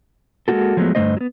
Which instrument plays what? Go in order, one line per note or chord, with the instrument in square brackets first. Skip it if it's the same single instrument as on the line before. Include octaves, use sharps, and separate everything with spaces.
[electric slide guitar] G#3 A#3 C#4 E4 F#4 A4
F3 F#3 G#3 A3 B3
G2 D3 E3 A3 C5 D#5
F#3 B3